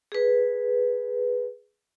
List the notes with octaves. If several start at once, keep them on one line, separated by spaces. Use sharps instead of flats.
G#4 B4